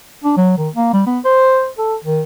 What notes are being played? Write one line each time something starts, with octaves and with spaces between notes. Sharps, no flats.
D4
F#3
D#3
A#3
G3
B3
C5
A4
D#3